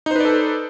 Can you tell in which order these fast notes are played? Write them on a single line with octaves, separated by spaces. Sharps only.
D#4 C5 B4 D5 A4